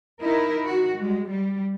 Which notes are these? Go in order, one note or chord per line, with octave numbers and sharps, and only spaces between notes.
D#4 E4 A#4
D#3 F#4
G#3
G3